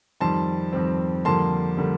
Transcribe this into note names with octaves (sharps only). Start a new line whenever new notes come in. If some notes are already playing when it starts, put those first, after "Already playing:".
F2 D#3 G3 C4 A5 C6
F2 D#3 G3 C4
F2 D3 G3 A#3 A5 C6
D3 G3 A#3